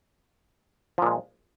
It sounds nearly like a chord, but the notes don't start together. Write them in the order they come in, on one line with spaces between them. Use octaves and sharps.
F3 A#2 G#3